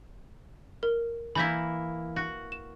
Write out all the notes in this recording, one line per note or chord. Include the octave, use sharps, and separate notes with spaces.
A#4
E3 A#3 E4 B5 G6 B6
F#4
E7